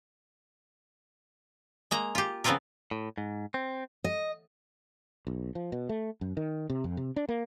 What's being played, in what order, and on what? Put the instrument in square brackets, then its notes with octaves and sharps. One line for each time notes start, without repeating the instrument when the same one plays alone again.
[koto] G#3 A#3 A#5
F4 G4
C#3 F3 B3 C4 F4 A#4
[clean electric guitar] A2
G#2
C4
[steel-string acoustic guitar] D#5
[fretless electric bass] B1
F3
B2
A3
F#2
D#3
C3
F2
C3
D4
A#3